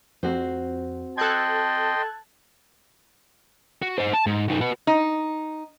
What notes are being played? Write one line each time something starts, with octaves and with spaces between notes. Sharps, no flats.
F2 C4 F#4 C5
A4 D#5 G5 A5 C6 F#6 G#6
F#4
D#4 C5
A5
G#2
F#2 D#4
F#4 B4
D#4